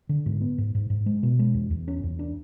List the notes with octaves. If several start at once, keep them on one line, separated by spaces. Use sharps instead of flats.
D3
G#2
B3
G#2
G#2
G#2
G#3
B2
G#3
E2
E2
C#4
E2
D4